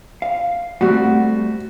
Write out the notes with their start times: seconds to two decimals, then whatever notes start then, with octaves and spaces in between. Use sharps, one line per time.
0.22 F5
0.81 G3 A3 C4 F#4